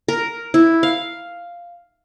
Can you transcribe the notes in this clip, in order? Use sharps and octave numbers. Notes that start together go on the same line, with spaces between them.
A#4
E4
F5